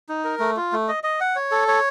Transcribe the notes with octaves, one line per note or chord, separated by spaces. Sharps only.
D#4
A#4
A3
F4
A3
D#5
D#5
F#5
C#5
A4
C#5